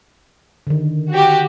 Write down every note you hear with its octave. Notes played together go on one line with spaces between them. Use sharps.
D3 D#3
F#4 G4